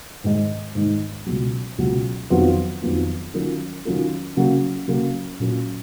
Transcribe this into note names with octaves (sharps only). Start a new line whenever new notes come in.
G#2 D#3 G#3 D#4
G#2 D#3 G#3 D#4
C#2 B2 F#3
C#2 B2 F#3
F2 D#3 F#3 B3 F4
F2 D#3 F#3 B3 F4
D#3 F#3 C#4 F4 A#4
D#3 F#3 C#4 F4 A#4
C#3 F#3 A#3
C#3 F#3 A#3
A#2 F#3 A#3 C#4